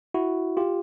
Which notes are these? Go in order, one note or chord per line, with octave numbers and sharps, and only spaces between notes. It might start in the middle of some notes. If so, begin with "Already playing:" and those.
E4 F#4
F4 G4